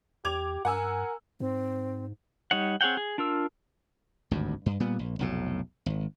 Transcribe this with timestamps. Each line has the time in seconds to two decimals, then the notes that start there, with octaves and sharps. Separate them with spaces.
0.25 E2 G4 D6 G#6 F7
0.65 G2 A#4 F#5 G#5 E6
1.40 G#2 C4
2.51 G3 D#4 C#5 F#5
2.81 C4 G#4 C#5 F#5 G5
2.97 G#4
3.18 D4 F4 A#4 E6
4.31 G#1 D2 G2
4.66 G2
4.80 A#2 G3 B3
4.99 A#1
5.19 F1 B1 A2
5.86 G#1